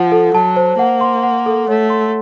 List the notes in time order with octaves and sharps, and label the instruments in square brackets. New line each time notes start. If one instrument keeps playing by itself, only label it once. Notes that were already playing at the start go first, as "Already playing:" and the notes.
Already playing: [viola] F3 [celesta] F#5
[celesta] A4
[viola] F#3 [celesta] A5
[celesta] C5
[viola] A#3 [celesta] F#5
[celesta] C6
F#5
A4
[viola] A3 [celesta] C#5
[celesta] C6